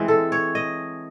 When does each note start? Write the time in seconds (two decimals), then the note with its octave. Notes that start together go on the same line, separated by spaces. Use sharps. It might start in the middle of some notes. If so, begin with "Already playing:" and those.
Already playing: E3 G#3 C4
0.08 A4
0.32 C#5
0.55 D#5